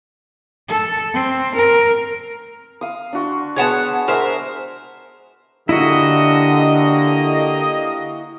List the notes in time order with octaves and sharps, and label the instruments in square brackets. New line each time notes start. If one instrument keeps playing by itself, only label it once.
[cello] A4
C4
A#4
[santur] F5 D#6
D4 F#4 C6
[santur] G#3 B3 [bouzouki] C#5 F#5 A5
[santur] G#3 [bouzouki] A#4 C5 E5
[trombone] D3 [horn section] A#3 G4 D#5 [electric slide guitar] E4 F#4